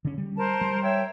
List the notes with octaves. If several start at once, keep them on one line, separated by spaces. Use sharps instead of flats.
D3 C#4
G3
A#4 C5 A5
G3
C#5 E5 G5